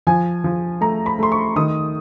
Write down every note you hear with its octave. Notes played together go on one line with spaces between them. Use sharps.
F3 G#5
F3
A3 A#5
B5
A3 C6
C#6
D#3 D#6